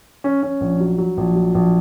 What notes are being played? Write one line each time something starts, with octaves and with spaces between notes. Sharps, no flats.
C#4
C#4
A#1
F#3
F#3
A#1
F#3
A#1